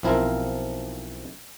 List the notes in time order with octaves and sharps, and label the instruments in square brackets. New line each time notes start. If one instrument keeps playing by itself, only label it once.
[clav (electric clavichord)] B1 F3 C4 E4 F4 A#4